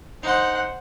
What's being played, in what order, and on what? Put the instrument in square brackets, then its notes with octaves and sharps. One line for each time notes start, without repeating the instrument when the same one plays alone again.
[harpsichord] D#4 C6 [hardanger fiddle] C5 F#5